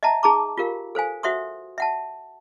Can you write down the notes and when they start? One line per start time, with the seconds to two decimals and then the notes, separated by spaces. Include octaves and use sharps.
0.03 D#5 E5 F#5 A5 A#5
0.23 D#4 G#4 A5 A#5 C#6 D6
0.58 F4 G4 A#4 F5
0.95 A4 C5 F5 G#5
1.23 F#4 C5 E5 F#5 C6 D#6
1.78 E5 F#5 A5